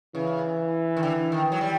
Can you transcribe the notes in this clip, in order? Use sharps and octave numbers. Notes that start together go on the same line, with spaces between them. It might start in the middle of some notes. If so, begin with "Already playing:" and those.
C#3 E3
D#3
D3
D#3
F#3
G3